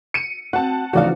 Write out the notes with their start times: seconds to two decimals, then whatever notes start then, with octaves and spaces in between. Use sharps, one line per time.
0.14 C#7 D#7
0.53 C4 F#4 F#5 A5
0.93 D2 C#3 E3 F3 D#4 F#4 D5 F5